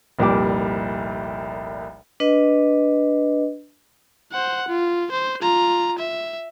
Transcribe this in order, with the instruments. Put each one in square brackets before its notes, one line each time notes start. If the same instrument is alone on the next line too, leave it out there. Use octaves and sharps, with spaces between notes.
[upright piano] F1 C2 A#2 G3 D6
[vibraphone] D4 B4 D#5
[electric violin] C5 F#5
F4
C5
F4 A#5
E5